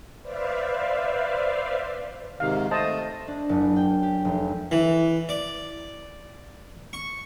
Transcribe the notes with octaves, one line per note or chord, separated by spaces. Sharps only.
B4 C5 D5 E5 F5
G#2 C3 D#3 F5
A3 C5 D#5 A5
D4
F#1
G5
G4
F1
E3
D5
C#6